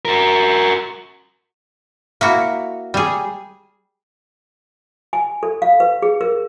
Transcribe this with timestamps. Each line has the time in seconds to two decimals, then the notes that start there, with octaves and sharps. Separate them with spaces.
0.05 F#4 A#4
2.21 A#3 E4 F#4
2.94 G3 G#4
5.13 G#5
5.43 A4
5.62 F5
5.80 B4
6.02 G#4
6.21 A#4